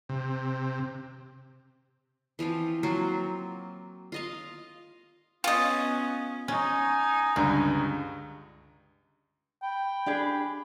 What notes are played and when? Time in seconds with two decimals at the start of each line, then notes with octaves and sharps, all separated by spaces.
0.09 C3
2.39 E3 F3 C4 F4
2.83 F#3 A#3 C4 F4
4.12 F4 D#5 F5
5.44 B3 C#4 F4 D#5
6.48 C#4 D#4 G#5
7.36 C#2 G2 D3 A#5
9.63 G5 B5
10.06 D4 G4 G#4